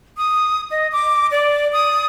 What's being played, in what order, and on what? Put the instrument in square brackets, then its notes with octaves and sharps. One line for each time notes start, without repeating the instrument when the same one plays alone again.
[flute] D#6
D#5
D6
D5
D#6